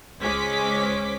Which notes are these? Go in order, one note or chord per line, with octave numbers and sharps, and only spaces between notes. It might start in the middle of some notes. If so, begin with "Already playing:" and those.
C#2 G#3 C#4 C5 D6 B6